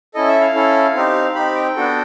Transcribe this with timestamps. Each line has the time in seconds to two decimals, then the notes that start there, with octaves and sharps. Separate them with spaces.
0.14 C#4 E4 A4 D#5
0.28 E5
0.41 F5
0.55 C#4 E4 A4
0.95 C4 D#4 G4
1.35 C4 D#4 G4 B5
1.55 G5
1.76 B3 D4 F#4 A4